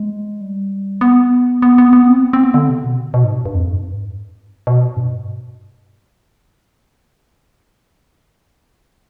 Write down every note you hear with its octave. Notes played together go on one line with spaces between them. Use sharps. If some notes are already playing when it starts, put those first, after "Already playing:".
Already playing: G#3
G3
B3
B3
B3
B3
C4
B3
C4
B3
D3
C3
B2
B2
G#2
G2
F2
G2
G#2
B2
G2